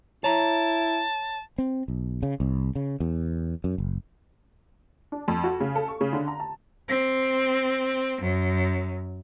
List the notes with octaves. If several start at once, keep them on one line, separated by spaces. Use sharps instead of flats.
E4 C#5 A5 A#5
C4
B1
C#3
C2
C#3
E2
F#2
F#1
D4
F2
F#4
C#3
A4
C#6
C#3
D3
A#5
A5
C4
F#2